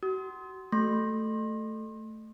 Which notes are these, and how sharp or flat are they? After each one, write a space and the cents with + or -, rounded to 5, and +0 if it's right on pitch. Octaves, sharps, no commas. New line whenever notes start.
F#4 +35 D#6 +35
A3 +0 C6 +35